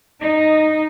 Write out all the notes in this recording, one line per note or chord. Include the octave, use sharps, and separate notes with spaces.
D#4